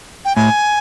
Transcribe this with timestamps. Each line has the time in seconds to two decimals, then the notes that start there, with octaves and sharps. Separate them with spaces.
0.25 G5
0.36 A2 G#5